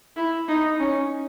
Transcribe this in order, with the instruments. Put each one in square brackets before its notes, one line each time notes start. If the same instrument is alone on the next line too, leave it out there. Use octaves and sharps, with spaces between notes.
[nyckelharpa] E4
D#4
C#4